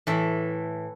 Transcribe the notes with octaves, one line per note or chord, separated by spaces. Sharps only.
A2 E3 A4